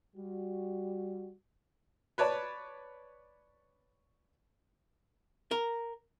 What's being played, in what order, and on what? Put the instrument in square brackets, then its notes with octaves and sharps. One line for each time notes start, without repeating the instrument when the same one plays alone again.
[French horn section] G3 F#4
[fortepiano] B4 C#5 D5 A5
[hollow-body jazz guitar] A#4